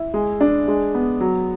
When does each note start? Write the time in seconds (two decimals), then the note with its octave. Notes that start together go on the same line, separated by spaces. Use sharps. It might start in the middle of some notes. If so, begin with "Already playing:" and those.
Already playing: E4
0.14 G#3
0.41 D4
0.68 G#3
0.95 B3
1.20 F#3